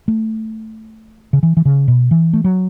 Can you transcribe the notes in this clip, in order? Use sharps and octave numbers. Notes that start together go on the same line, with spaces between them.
A3
C#3
E3
E3
C#3
B2
E3
A3
F#3